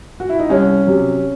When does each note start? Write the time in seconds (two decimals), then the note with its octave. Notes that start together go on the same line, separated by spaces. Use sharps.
0.20 F#4
0.29 E4
0.39 D#4
0.49 C2 C#4
0.87 C3 F#3